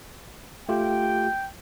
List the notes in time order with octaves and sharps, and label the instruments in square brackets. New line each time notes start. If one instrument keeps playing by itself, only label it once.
[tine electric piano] A3 F4 G4 [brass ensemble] G5